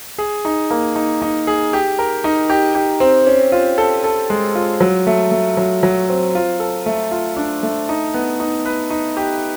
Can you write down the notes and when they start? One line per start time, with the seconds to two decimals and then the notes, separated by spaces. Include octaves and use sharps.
0.18 G#4
0.45 D#4
0.71 A#3
0.96 D#4
1.22 D#4
1.47 G#4
1.73 G4
1.99 A#4
2.24 D#4
2.50 G4
2.75 G4
3.00 C4
3.27 C#4
3.52 F4
3.78 A4
4.04 A4
4.30 G#3
4.55 F4
4.81 F#3
5.07 A3
5.31 A3
5.57 F#3
5.83 F#3
6.09 C4
6.35 F4
6.60 A4
6.86 A3
7.11 F4
7.36 D4
7.63 A3
7.89 D#4
8.14 B3
8.40 D#4
8.65 B4
8.90 D#4
9.17 G4